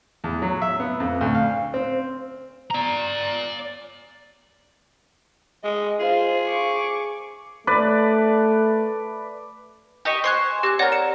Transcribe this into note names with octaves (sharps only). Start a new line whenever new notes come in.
E2
F#3
E5
B3
F2
D2
F5
C4
D5 A#5
G#3 D#5
F4 G#4 C5
C#6 D6
A3 B4 D5
G4 D#5 C#6
C5 G#5 C6 C#6 F#6
C4 G4 F#6
C4 A#4 C#5 D5 F#5
C#7 E7